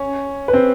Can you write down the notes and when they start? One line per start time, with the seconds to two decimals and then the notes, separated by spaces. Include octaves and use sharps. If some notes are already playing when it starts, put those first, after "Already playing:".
Already playing: C#4 C#5
0.48 B4
0.53 C4 C5